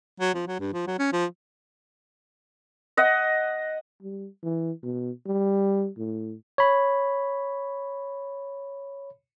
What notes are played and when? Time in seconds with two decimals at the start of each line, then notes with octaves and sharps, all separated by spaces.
0.20 F#3
0.34 F3
0.47 F#3
0.60 G2
0.73 F3
0.87 F#3
0.99 C#4
1.13 F3
2.97 D#5 F#5
4.02 G3
4.44 E3
4.83 B2
5.26 G3
5.98 A2
6.58 C#5 B5